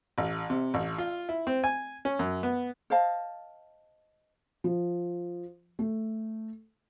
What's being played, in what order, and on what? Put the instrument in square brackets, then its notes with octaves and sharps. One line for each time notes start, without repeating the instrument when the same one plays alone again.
[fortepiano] A1
C3
A1
F4
E4
C4
G#5
C#4
F#2
B3
[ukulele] C5 D#5 F5 A5
[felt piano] F3
A3